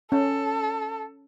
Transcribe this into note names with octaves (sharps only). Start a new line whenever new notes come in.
C#4 A4